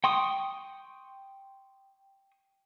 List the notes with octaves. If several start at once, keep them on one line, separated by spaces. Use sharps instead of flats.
G5 C6 C#6 D#6